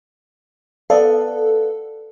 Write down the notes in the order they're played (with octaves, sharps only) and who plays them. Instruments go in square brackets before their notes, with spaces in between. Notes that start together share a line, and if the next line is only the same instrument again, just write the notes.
[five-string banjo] B3 D5 F5 [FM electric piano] A4